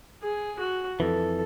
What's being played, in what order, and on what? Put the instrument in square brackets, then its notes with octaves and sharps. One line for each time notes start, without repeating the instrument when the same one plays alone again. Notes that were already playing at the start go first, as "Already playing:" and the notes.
[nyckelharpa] G#4
F#4
[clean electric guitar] F2 E3 [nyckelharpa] A4